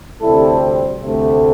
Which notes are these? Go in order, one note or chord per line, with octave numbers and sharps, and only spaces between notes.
D2 C3 G3 C4 E4 A4
D2 C3 A3